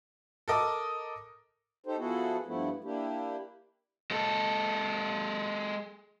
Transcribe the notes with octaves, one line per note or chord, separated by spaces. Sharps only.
A4 A#4 D#5 D6 D#6
D#4 G4 A4 C5
F3 B3 E4 F#4 G#4 A4
G2 F3 A3 B3 E4
A#3 D4 E4 G4
G#3 A4